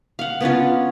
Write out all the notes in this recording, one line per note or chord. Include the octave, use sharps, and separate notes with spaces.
F5 F#5
B3 C#4 D4 F4